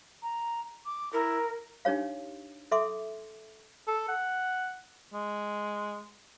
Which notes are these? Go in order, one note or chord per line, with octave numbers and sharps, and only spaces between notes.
A#5
D6
E4 A#4
D4 D#4 G4 C#5 F5
A4 E5 C6 D6
A4
F#5
G#3